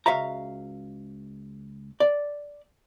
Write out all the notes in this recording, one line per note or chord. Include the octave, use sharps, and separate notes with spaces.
C#2 F#4 E5 F5 A#5
D5